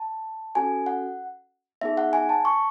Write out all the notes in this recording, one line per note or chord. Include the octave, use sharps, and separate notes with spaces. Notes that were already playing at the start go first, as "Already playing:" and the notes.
Already playing: A5
C#4 F#4 A4 G#5
F#5
B3 D#4 G#4 E5
F#5
G#5
A5
C#6